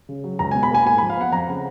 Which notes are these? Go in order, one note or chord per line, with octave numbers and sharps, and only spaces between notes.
C#3
F#3
C#2 A#5
B2 G#5
B5
A#3 G#5
G#2 G#5
F3 B5
F5
B3 F#5
F2 A#5
C#3